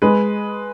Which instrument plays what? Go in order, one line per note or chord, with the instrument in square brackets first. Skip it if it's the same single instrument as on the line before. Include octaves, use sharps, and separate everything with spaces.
[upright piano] G#3 [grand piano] B4